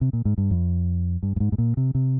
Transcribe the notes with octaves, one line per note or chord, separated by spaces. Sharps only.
C3
A#2
G#2
G2
F2
G2
G2
G#2
G#2
A#2
C3
C3